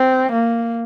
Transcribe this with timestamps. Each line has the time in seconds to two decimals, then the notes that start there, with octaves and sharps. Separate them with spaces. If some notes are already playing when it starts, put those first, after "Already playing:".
Already playing: C4
0.32 A#3